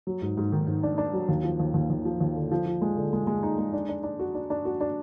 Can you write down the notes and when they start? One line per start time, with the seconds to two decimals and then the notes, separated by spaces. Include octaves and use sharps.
0.07 F#3
0.22 G#2
0.37 G#2
0.52 D#3
0.68 G#2
0.83 D4
0.98 D4
1.13 F#3
1.29 D#2
1.44 F3
1.60 D#2
1.74 D#2
1.90 D#2
2.05 F3
2.21 D#2
2.35 D3
2.52 F3
2.66 F3
2.82 G#3
2.96 D3
3.13 G#3
3.27 G#3
3.43 D#4
3.58 G#3
3.73 D4
3.89 D4
4.03 D4
4.19 F#4
4.35 D4
4.50 D4
4.65 F#4
4.81 D4